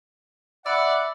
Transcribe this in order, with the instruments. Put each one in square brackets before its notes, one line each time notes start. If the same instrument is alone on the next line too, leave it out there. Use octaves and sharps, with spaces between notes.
[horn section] D5 [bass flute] E5 [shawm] F#5 [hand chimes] B5 E6